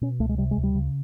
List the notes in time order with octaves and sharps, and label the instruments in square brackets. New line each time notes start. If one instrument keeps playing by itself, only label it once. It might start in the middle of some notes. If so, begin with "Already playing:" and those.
[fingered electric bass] B2 C#4
C#2 A3
G#3
C3 G3
G#3
D2
G3
C#3